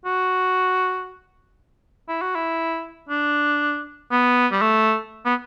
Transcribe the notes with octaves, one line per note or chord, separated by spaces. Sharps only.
F#4
E4
F#4
E4
D4
B3
G3
A3
B3